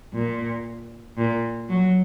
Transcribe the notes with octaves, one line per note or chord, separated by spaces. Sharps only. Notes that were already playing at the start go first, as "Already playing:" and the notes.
A#2
A#2
F#3